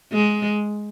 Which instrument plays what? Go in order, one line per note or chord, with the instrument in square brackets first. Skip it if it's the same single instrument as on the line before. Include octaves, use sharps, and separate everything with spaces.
[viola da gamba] G#3